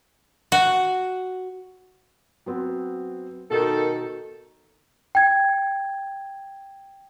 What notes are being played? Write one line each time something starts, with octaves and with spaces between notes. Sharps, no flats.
F#4
F#3 B3 C4
B2 D#3 D#4 A4
G5 G#6